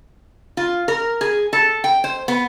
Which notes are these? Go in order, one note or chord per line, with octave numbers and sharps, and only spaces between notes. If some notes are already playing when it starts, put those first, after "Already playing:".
F4
A#4
G#4
A4
G5
C5
B3